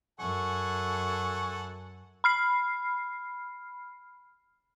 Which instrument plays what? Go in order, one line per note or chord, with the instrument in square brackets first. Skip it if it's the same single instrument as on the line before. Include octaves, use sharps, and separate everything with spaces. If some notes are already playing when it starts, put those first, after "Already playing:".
[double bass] F#2 [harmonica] A4 F#5 G#5 [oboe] C#6
[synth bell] B5 F6 C7